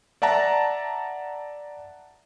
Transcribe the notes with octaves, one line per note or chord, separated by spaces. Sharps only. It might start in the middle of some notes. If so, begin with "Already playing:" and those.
D5 E5 F#5 A5 A#5